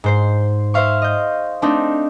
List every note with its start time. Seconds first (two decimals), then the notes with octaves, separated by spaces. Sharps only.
0.04 G#2 C5 C7
0.74 C5 E5 F5 C#6
1.02 D#5 G6
1.62 A3 C4 D4 D#4